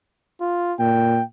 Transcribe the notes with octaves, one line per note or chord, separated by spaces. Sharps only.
F4
A#2 G5